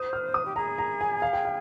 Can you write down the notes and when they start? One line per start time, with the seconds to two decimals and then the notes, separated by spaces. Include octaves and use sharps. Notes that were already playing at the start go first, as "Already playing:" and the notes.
Already playing: C5 D#6
0.13 F6
0.34 D#6
0.45 G4
0.56 G#4 A#5
0.78 A#5
1.01 G#5
1.22 F5
1.33 G5
1.45 F5